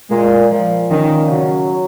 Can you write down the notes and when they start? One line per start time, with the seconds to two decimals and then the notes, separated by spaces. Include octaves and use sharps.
0.10 A#2 G#3
0.50 A#2 F3
0.89 D#3 C#4
1.29 C#3 F#3